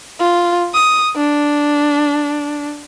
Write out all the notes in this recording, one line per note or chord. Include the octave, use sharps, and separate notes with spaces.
F4
D#6
D4